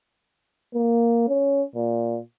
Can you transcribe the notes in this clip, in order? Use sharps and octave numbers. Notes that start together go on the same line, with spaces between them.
A#3
C#4
A#2